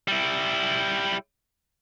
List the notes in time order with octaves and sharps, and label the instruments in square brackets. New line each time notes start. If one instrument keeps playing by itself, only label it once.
[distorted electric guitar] G3 E4